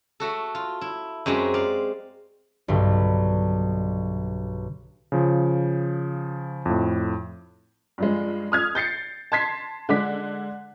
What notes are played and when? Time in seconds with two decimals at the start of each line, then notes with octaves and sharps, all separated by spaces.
0.20 A3 F#4 A4
0.55 F4
0.81 E4
1.26 F#2 G#3 C4 F#4 G4
1.54 D5 F5
2.68 B1 G2 D3
5.12 C#3 F3
6.66 F2 A2
7.98 G2 F3 G#3
8.52 D#6 F6 G#6
8.75 G6 A6 C7 C#7
9.32 A5 C6 G#6 B6 C7
9.89 D3 G#3 D6 B6